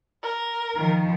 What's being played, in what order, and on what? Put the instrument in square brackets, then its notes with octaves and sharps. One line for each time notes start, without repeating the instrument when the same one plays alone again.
[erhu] A#4
[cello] D#3 F3